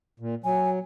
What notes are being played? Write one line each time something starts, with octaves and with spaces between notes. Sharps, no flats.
A#2
F#3 G#5